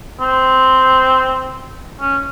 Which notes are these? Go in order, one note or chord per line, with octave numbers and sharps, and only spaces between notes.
C4
C#4